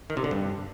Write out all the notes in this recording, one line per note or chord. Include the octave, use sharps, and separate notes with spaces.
D#3
C3
D3
G2